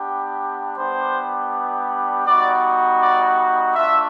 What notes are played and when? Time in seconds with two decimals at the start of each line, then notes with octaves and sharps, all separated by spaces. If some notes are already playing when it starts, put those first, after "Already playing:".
Already playing: B3 D4 G4
0.78 G3 B3 D4 G4 C5
2.27 G3 B3 D#4 F#4 D5
3.01 D5
3.75 A3 D4 F4 E5